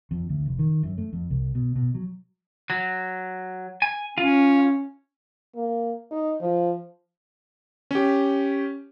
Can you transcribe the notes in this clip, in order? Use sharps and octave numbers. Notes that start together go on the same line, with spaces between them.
F2
D2
F1
D#3
F#2
A3
F2
C2
B2
B2
F#3
F#3
G#5
C#4 F4
A#3
D#4
F3
C#4 G4